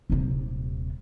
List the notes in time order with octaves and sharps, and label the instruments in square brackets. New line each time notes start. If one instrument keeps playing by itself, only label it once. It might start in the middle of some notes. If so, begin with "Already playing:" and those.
[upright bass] D#1 C3